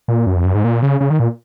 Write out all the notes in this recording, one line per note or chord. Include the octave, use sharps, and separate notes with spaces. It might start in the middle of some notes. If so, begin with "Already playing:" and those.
A#2
F#2
F2
F#2
G#2
A#2
C#3
C#3
D#3
A#2